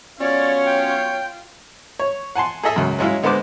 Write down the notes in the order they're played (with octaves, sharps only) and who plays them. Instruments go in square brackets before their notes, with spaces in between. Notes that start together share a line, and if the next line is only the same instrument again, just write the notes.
[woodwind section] F#3 B3 C#5 [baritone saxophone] C#4 [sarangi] F4 [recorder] D5
[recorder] G5
[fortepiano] C#5
F#5 G#5 A5 C6
G#4 A4 D#5 E5
C#2 F#2
F#3 G#3 C#4 E4 F4
D3 G#3 B3 B4 C5 D6